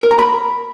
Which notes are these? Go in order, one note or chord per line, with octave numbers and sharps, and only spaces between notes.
A#4
A#5
B5